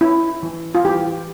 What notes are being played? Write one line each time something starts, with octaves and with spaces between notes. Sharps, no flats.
C#4 E4
E3
F4
E3 G4